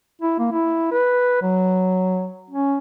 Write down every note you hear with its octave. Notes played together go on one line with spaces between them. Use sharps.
E4
A#3
E4
B4
F#3
C#4